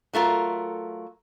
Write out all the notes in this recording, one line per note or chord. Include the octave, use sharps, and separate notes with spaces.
F#3 A3 F4 A#4